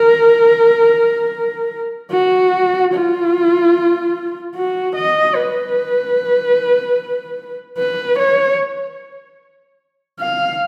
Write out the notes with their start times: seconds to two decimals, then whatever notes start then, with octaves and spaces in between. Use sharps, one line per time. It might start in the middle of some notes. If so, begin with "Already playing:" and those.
Already playing: A#4
2.12 F#4
2.93 F4
4.55 F#4
4.95 D#5
5.35 B4
7.78 B4
8.18 C#5
10.20 F5